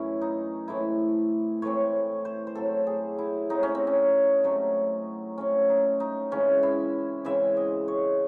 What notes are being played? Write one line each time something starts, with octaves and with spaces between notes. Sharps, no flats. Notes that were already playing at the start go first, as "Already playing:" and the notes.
Already playing: F#2 E3 A3 C#4 E4
D#4
A2 E3 A3 C4 E4
A2 E3 A3 C4 C#5
C5
C5
A2 F#3 C4 A4
G#4
E4
A2 F#3 C4 D#4
C#4
C4
C#4
C3 F#3 A3 C4
C3 F#3 A3 C4 C#4
D#4
D#4
C#3 E3 G#3 C4 C#4
E4
C#3 E3 G#3 C4 E5
D#5
C#5